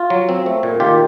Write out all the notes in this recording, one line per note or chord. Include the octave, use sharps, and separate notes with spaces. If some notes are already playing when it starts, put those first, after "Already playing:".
Already playing: F4
F#3
C4
A3
A#2
D#3 F4 G4